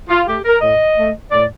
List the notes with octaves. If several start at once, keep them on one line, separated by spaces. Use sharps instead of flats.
F4
A3 G4
A#4
A2 D#5
A3
A2 D5